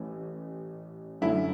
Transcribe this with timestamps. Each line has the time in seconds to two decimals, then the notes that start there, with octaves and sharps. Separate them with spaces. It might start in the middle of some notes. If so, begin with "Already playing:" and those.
Already playing: A1 E3 A3 C#4
1.21 F#2 D3 A3 C#4 E4